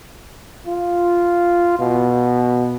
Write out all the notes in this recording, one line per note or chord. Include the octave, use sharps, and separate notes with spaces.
F4
B2